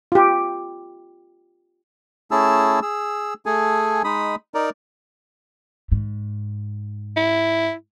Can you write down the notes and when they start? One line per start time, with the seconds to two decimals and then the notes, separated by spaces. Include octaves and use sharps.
0.12 F4 G4
2.31 A3 C#4 E4 G#4 A5 E6
2.82 G#4 E6
3.46 A3 G#4 A4 G#5
4.04 G#3 D#4 B5 D#6
4.54 D#4 A#4 D5
5.92 G#2
7.17 E4